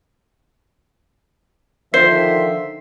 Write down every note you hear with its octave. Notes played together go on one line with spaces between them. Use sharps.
D3 D#3 F3 C5 E5 C7